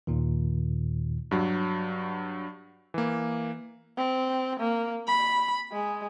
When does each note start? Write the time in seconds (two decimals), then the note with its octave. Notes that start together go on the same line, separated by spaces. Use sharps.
0.07 D#2 A#2 D#3
1.31 G2 F#3
2.94 E3 A#3
3.98 C4
4.60 A#3
5.07 B5
5.72 G#3